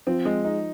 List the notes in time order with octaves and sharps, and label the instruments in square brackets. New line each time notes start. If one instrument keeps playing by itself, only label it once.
[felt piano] F3 [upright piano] C4
[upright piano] G#3
D#4